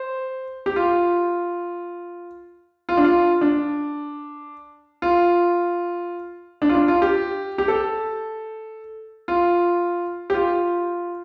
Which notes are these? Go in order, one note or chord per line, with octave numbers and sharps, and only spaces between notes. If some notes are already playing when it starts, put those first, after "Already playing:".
Already playing: C5
G4
F4
F4
D4
F4
D4
F4
D4
F4
D4
F4
G4
G4
A4
F4
G4
F4